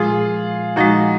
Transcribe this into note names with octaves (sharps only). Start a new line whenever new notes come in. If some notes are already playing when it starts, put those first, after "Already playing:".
Already playing: A#2 F3 G#3 F4 G#4
A#2 F3 G#3 D#4 F#4